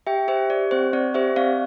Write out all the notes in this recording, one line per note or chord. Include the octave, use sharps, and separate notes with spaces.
G4 E5 G5
G4 C5 E5
G4 D5
C4 C5
C4 D5
G4 C5 E5
C4 D5 F5